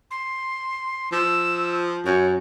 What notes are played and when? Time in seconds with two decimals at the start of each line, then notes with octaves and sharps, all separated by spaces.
0.11 C6
1.12 F3 E6
2.06 F#2 C#5